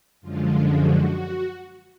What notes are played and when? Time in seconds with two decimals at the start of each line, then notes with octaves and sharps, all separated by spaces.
0.21 F#2 D3 F3 G#3 F4
0.73 F#4